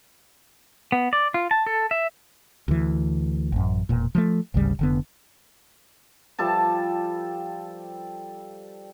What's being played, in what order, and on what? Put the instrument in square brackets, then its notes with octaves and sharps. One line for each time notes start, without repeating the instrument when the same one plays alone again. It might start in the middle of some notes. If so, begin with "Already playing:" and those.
[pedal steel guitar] B3
D5
F4
A5
A4
E5
[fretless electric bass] D2 E3
A1 F#2
E1 A#2
F3 F#3 A3
G#1 D2 C#3 G3
F1 D3 B3
[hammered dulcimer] F3 G3 A4 A5